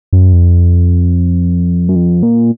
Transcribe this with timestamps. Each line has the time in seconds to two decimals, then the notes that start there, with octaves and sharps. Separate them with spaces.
0.13 F#2
0.32 F2
1.89 F#2
1.96 F2
2.23 A#2